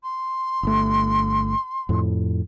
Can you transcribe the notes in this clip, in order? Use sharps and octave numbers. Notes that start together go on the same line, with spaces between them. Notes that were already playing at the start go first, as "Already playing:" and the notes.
C6
G1 A3
F2 A2